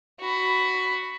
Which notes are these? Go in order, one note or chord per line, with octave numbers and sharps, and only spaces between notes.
F#4 B5